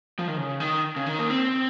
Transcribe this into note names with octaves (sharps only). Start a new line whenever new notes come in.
F3
D#3
C#3
D#3
C#3
D#3
A#3
C4